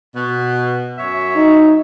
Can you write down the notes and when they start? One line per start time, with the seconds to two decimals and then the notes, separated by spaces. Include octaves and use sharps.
0.15 B2
0.98 F#2 C#5 E5
1.36 D#4